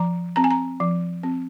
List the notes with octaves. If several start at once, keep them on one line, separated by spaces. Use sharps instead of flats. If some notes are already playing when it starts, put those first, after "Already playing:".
Already playing: F3 A#5
C4 A#5
G#5
A#5
F3
C4